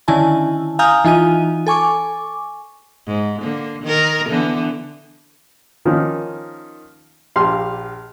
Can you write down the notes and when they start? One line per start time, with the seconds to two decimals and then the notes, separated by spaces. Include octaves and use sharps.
0.08 D3 D#3 C#4 E4 G#5 A5
0.79 F5 G#5 A#5 D#6 F6 G6
1.05 E3 D#4 F4 G#5 D#7
1.67 A4 G#5 C#6 D6
3.07 G#2
3.41 D3 A#3
3.83 D#3 A#4
4.29 D3 E3 B3
5.85 D#3 F3 A#3 C#4 D#4
7.36 A#1 G4 F5 C6